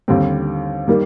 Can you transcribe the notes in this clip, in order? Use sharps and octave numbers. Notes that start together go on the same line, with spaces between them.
D#2 D3 G3 C4
D#3 G3 A#3